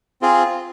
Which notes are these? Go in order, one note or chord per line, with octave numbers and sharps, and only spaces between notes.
C4 F4 G#4